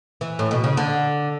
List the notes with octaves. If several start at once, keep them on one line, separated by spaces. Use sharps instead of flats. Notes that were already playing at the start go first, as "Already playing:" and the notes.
E3
A2
B2
C#3
D3